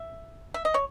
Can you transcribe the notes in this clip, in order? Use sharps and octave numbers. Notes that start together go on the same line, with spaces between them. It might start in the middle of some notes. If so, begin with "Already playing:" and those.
Already playing: E5
E5
D#5
C#5